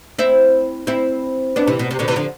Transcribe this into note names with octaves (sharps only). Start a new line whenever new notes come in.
C4 E4
C4 E4
B3 D4
C3 E3
B2
C3
B2 D3
C3 E3
D3 F3